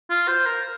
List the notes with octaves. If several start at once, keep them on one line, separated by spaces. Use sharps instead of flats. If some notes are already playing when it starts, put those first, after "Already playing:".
F4
C5
A#4